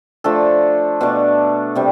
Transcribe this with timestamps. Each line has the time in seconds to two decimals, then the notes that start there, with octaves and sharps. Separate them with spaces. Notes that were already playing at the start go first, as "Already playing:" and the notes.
0.24 F3 A3 D4 A4
1.01 B2 A3 D4
1.75 C3 G3